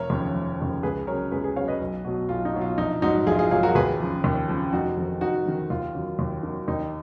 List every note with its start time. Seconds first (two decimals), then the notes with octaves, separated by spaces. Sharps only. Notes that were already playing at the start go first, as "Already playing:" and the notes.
Already playing: F1 A#4 C#5
0.10 D#2 C#3 F3
0.34 F1
0.59 D#2 C#3 F3
0.83 C#2 G#4 B4
1.07 C#3 F#3 A#4 C#5
1.32 C#2 G#4 B4
1.44 G#4 B4
1.56 C#3 F#3 C#5 F5
1.68 B4 D#5
1.81 B1
2.05 B2 F#3
2.29 B1 F4
2.45 D#4
2.54 B2 F#3
2.61 F4
2.78 A#1 D#4
3.02 G#2 F#3 D#4 F#4
3.27 A#1 F4 G#4
3.39 F4 G#4
3.51 G#2 F#3 F4 G#4
3.63 F#4 A#4
3.75 D#2 G#4 B4
4.00 C#3 F3
4.24 D#2
4.49 C#3 F3
4.73 F1 D#4 F#4
4.97 F2 D#3
5.21 F1 D#4 F#4
5.46 F2 D#3
5.70 D#2 F4
5.95 D#3 F#3
6.19 D#2
6.43 D#3 F#3
6.68 D#2 D#4